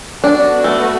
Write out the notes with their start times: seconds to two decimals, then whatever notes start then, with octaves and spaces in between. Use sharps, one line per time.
0.24 B3 D4 F#4 A4
0.64 A3